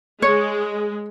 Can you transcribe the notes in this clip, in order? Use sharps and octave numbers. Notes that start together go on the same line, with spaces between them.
G#3 C#5